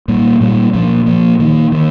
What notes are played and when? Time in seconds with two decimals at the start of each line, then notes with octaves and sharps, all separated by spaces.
0.08 A#2 G3 A#3
0.41 A#2 G3 A#3
0.73 A#2 F3 A#3
1.06 A#2 F3 A#3
1.39 D#3 A#3
1.72 D#3 A#3